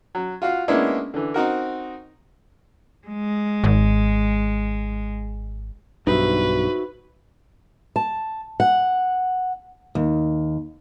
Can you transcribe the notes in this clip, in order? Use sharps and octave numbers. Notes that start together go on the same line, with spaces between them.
F#3
F4 F#4 F5
G#3 A#3 B3 C#4 D4 E4
D3 E3
C4 D#4 F#4 A#4
G#3
G#1
B1 G2 D#4 F#4 B4 C5 E5
A5
F#5
D#2